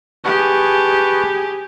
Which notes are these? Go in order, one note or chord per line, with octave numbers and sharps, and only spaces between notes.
G4 G#4 B4 A5 C#6